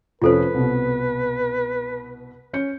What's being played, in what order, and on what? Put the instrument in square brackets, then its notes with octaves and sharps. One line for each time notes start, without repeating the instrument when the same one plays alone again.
[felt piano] F1 F3 C#4 [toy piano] F4 A4 C5 [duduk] B4
[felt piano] C2 B2
C#4 G6 C#7